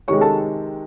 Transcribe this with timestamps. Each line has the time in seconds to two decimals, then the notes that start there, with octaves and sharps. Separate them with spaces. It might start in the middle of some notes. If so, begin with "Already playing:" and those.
0.08 C3 D#3 G#3 C#5 C#6
0.21 A4 A5